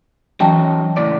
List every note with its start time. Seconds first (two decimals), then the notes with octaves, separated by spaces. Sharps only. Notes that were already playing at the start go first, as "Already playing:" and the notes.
0.40 E3 F#3 C#4 D#4 G5 A5
0.97 C#2 A2 D5